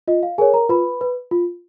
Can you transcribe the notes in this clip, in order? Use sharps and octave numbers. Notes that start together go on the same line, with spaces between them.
F4 D#5
F5
G#4 A#4 C#5 G#5
A#4 A#5
F4 B4 B5
B4
F4